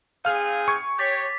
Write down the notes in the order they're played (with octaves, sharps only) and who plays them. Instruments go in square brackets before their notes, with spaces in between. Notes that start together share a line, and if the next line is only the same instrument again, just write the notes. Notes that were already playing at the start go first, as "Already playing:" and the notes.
[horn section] C4 D#4 G#4 [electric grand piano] F5 F6
[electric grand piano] C#6 G#6
[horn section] G4 C#5 [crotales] D6 A6 B6